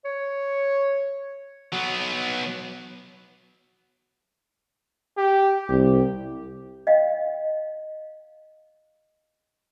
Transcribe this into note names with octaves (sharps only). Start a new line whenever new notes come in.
C#5
F#3 B3
G4
C2 G4
D#5 F5 G5